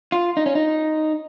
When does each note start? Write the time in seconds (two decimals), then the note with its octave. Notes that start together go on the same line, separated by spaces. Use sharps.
0.12 F4
0.37 D#4
0.46 C#4
0.55 D#4